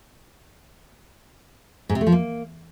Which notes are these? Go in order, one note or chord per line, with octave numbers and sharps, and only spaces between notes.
G#2
C3
A3
F3
A#3